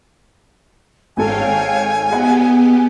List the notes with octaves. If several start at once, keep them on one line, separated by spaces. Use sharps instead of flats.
G#1 G#2 A4 C#5 F5 G5 G#5
B3 G4 G#4 D#5 F#5